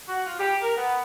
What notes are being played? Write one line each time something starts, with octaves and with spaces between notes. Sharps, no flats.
F#4
F4
G4
A#4
B3